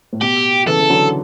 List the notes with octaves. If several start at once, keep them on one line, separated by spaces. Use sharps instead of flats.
A2
B2 G4
C#3 E3 A4
E3
D3 F#3